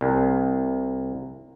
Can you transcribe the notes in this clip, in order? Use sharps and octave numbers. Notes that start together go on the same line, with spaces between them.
C2